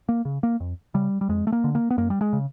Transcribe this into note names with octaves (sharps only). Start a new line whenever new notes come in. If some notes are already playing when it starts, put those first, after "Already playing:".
A#3
C#3
A#3
F2
C#3 G3
G3
F2 G#3
A3
A#3
D3
A#3
B3
F#2 A#3
G3
G#3
C#3